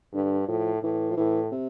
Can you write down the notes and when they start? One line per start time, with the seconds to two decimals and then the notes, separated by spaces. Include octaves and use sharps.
0.13 G2 D3
0.48 A2 F3
0.82 A2 E3
1.10 F3
1.17 A2 E3
1.52 C3